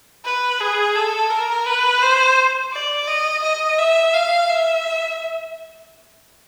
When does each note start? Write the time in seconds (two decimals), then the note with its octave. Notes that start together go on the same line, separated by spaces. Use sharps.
0.25 B4
0.60 G#4
0.96 A4
1.30 A#4
1.66 B4
2.02 C5
2.73 D5
3.08 D#5
3.43 D#5
3.78 E5
4.14 F5
4.49 E5